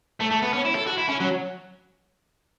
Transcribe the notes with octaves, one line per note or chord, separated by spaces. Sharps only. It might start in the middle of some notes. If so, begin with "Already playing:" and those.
A3
A3
B3
C#4
E4
A4
F#4
E4
C#4
F#3